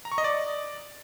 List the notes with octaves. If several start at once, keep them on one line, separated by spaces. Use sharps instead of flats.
A#5
C#6
D#5
D5